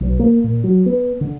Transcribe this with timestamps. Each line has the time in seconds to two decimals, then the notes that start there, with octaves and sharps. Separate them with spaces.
0.01 B1
0.19 A#3
0.44 A#2
0.64 F#3
0.86 B3
1.21 D3